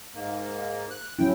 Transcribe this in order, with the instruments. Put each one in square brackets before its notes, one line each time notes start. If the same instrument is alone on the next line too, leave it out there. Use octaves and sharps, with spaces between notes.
[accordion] G#2 A#3
F#6
[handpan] F#3 C#4 E4 [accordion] G5